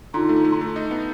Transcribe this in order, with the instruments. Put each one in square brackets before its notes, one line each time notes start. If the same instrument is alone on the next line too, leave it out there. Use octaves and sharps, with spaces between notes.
[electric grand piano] D3 [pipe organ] D#4 F4
[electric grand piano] A3
A3
A3
D#4
B3